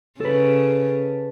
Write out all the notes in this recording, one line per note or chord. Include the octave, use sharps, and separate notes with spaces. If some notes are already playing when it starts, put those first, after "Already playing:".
C#3 A4 B4